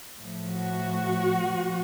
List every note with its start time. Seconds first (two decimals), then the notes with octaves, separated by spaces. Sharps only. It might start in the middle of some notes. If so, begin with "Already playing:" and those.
0.18 A2 F3
0.50 F#4
1.47 A#2 F3